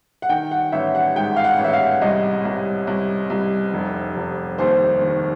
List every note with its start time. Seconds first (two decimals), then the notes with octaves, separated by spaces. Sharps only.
0.22 F#5
0.29 D#3 G5
0.51 F#5
0.72 A1 E5
0.95 F#5
1.16 G#2 G5
1.36 F5
1.44 F#5
1.59 A1
1.64 E5
1.73 F5
2.02 C2 D#5
2.45 C2
2.87 C2
3.30 C2
3.74 F1
4.17 F1
4.58 D#2 C5
5.02 D#3